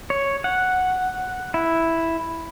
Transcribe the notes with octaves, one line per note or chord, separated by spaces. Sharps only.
C#5
F#5
E4